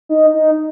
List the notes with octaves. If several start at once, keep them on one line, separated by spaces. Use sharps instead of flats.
D#4
D#4